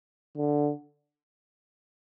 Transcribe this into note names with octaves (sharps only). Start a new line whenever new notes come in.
D3